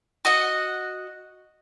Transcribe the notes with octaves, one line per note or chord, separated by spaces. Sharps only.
F#4 D#5 F#5